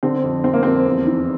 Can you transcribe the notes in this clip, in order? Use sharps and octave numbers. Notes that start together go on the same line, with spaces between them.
D3 C4
F2
F2 C4
A#3
F2 C4
E2
E3